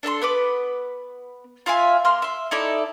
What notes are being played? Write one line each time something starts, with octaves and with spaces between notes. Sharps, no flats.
D4 A4 A5 C6
B3 B4 D6
F4 E5 F5 G#5
A#3 C6 F6
E5 C6
D#4 E4 A4 D5